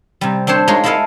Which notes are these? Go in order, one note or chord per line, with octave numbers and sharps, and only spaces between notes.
C3 G3
C4 D4 C5 C#5 G5
G#3 D#4 F4 A#4 C#5
A#3 E4 G#4 A4 D#5 F5